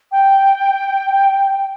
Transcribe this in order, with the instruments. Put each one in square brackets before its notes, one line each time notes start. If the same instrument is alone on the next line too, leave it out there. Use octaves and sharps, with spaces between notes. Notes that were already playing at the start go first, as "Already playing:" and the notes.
[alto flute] G5